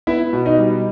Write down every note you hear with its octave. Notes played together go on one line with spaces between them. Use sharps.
B3 E4 E5
B2
D#4 D#5
G3